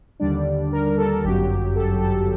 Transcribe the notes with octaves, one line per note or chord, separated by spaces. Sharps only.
D#2 D3 G3 D4 D5
A#4
A4
G1 F#2 F#3 G4
A4
A4